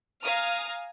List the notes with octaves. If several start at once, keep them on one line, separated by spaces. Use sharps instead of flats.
F5 G#5 A#5 D#6 F6